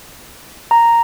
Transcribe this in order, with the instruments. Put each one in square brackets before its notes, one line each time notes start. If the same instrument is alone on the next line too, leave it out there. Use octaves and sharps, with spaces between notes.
[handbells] A#5